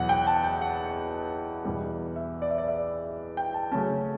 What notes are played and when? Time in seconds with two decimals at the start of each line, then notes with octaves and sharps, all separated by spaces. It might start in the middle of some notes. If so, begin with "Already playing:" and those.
Already playing: E2 B2 F#3 F#5
0.09 G5
0.27 A5
0.44 G5
0.62 F#5
1.65 E2 B2 G3 B3
2.16 E5
2.42 D5
2.51 E5
2.58 D5
2.68 E5
3.37 G5
3.54 A5
3.71 C#3 F#3 A3 C#4 A5